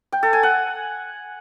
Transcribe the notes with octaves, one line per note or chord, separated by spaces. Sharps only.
G5
A4
G#5
F#5